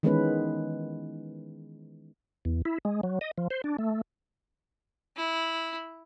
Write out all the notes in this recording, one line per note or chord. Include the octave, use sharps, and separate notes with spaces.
D#3 E3 G#3 B3 C#4 B4
E2
E4
G#3
F#3
D#5
F3
C5
D4
A3
E4